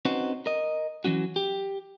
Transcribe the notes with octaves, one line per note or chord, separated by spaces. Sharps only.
C4 C#4 D#4 F#4 B4 C5
A#4 D#5
E3 F#3 C#4 F#4
G4